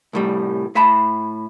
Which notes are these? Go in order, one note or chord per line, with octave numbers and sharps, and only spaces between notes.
C2 A2 G3
A2 E5 A5 B5